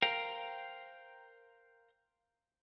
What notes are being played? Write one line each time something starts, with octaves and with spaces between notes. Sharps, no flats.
A#4 C5 F5 G5 A#5